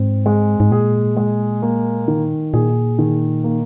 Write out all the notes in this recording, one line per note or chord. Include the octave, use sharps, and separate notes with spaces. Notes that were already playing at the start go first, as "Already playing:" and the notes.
Already playing: G#2 C4
G#3
G#2
A#2 G#4
G#3
A#3
D#3
A#2 G#4
D#3
A#3